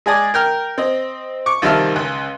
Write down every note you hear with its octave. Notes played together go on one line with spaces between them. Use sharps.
G#3 G#4 D5 D#6
A#4 G5 F6
C4 D#5
C#6 D6
C2 D#3 F3 G3 E5 F6
C#2 C#3